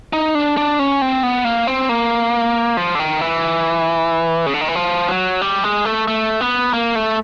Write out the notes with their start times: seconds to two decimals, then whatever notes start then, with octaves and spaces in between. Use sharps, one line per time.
0.13 D#4
0.35 D4
0.57 D4
0.79 C#4
1.02 C4
1.23 B3
1.45 A#3
1.67 C4
1.89 A#3
2.77 F3
2.95 D3
2.99 D#3
3.21 E3
4.46 C#3
4.54 D3
4.61 D#3
4.68 E3
4.75 F3
5.08 F#3
5.41 G3
5.64 G#3
5.85 A3
6.08 A3
6.41 B3
6.74 A#3
6.95 A3